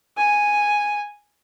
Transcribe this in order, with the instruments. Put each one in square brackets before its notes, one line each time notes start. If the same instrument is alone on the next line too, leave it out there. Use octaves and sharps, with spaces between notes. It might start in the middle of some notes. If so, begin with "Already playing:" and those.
[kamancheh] G#5